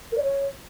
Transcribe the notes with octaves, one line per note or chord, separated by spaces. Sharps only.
A#4
D5
C#5